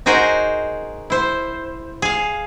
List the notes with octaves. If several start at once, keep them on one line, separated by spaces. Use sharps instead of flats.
D#4 F#4 G#4 A#4 C5
E4 C5
G#4 F5